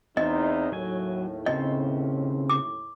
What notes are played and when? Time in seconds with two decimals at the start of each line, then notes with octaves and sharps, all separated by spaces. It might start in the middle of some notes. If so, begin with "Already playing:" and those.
0.17 E2 C4 D#4 E4 C5 D#5
0.72 D#2 A2 F#3 G#5
1.46 C#3 C4 D#5 G5
2.50 D6